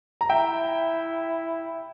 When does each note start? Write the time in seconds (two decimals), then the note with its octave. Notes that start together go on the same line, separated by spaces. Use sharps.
0.21 A#5
0.29 E4 E5 G5